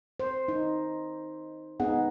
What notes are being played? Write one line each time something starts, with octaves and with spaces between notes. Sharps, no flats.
C5
D#4
B3 D#4 G#4 F#5